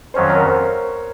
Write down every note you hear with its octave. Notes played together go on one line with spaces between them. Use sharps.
F2 D#3 F#3 C#4 C5
C#5
A#4
C5